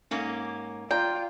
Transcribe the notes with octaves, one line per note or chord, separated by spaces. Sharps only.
G#2 A#3 C#4
F4 D5 G5 A#5